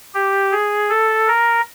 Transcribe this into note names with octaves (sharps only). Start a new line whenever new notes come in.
G4
G#4
A4
A#4